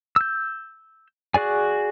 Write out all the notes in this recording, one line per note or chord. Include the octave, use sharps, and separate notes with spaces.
E6 G6
F#4 G#4 D5 G#5